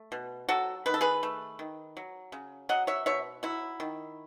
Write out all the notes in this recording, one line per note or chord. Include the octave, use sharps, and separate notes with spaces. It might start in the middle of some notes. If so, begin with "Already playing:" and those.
Already playing: A3
B2
F#3 F#4 A4
D#3 B4
A4
G#4 B4
A3
D#3
F#3
C#3
F#3 D#5 F#5
C#5 E5
B2 C#5 E5
F#3 E4
D#3